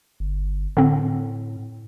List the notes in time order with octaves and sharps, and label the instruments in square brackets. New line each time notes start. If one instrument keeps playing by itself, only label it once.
[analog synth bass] G1
[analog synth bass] A2 [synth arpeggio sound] D3 C4